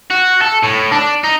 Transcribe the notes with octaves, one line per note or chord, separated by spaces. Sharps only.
F#4
A4
A2
D4
D#4